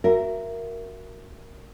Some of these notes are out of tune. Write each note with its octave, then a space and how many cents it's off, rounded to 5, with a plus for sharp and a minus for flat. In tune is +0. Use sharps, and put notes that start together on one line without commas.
F#4 +0 A#4 +0 E5 +20